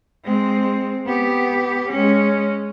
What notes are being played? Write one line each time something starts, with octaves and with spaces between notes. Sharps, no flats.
G#3 C4
B3 G4
G#3 C#4